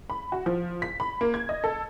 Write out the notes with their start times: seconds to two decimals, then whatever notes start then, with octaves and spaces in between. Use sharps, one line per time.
0.10 B5
0.32 F#4
0.46 F3
0.82 B6
1.00 B5
1.21 A#3
1.34 G#6
1.49 D#5
1.64 A4